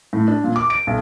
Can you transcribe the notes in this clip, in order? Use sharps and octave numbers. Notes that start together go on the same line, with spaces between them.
A2
D4
A#2
D6
D7
B1